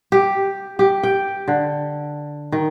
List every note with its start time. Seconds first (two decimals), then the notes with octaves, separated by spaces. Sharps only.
0.12 G4
0.79 G4
1.03 G5
1.48 D3
2.52 D#3